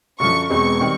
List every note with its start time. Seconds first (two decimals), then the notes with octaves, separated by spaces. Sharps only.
0.20 F#2 D3 F3 C#6
0.50 E1 E2 B2 G#3 C4 C#6
0.80 D#3 G3 C4